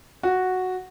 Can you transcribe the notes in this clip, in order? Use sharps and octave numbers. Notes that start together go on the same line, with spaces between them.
F#4